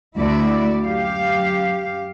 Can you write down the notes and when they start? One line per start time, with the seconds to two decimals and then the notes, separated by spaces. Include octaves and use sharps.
0.16 D2 E4 F#4 D5
0.82 F#2 G4 F5